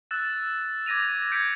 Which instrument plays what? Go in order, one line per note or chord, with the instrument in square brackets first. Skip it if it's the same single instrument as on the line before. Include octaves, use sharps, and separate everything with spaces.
[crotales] E6 F#6 A6 E7
D6 G#6 A#6 D#7 F7
G6 G#6 B6 C#7 D7